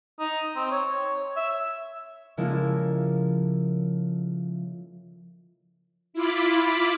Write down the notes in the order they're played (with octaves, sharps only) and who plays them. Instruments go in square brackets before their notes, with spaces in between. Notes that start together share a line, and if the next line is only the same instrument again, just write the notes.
[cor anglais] D#4
C4
C#5
E5
[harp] C#3 F3 G#3 A#3 E4 A4
[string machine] E4 F4 B5 D6